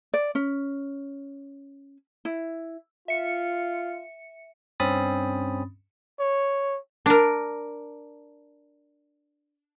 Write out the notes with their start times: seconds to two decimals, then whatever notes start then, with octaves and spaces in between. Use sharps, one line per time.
0.14 D5
0.35 C#4
2.25 E4
3.08 F4 E5 C#7
4.80 G2 C4 C#4 B5 D#6 A6
6.20 C#5
7.06 D4 A#4